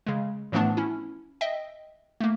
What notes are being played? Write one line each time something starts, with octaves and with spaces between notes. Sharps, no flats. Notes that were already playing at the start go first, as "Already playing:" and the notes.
C#3 G#3
A2 E3 F3 A3 B3 D4
C#4 E4
D#5 E5 G5
A3 A#3